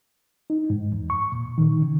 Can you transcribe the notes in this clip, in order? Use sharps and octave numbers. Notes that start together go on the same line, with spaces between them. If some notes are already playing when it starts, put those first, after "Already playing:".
D#4
G#2
E2
C#6
A#2
D#3
C#3